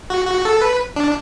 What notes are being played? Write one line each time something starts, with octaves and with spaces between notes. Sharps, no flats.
F#4
F#4
A4
B4
D4